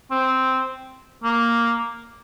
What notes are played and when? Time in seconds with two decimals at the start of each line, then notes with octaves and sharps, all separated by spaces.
0.11 C4
1.24 A#3